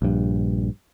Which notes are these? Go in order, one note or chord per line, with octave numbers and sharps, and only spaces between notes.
A#1 G2